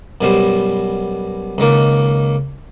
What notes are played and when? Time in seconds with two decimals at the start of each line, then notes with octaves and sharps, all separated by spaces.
0.21 F#2 B2 G3 C5
1.58 C#2 D#3 A#3